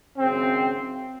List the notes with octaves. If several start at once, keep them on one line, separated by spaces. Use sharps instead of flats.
G#1 F#2 C#3 C4